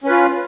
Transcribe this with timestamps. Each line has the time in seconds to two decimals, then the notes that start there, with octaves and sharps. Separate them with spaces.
0.04 C#4
0.07 B4
0.10 F4